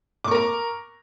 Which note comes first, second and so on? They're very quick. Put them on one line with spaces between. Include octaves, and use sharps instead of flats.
D6 C#6 A#4 A#5